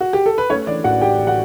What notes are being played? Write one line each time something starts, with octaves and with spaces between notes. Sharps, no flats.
F#4
G4
A4
B4
A3 C#4 C#5
E3 D4 D5
A1 F#4 F#5
A1 G4 G5
A1
F#4 F#5